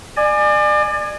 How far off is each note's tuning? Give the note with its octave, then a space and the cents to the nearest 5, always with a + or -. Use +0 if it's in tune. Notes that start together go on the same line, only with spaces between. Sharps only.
D5 +35 G#5 +0